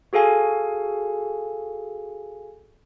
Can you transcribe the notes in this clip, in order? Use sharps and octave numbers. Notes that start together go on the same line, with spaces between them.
F#4 G#4 A4 F5 G#5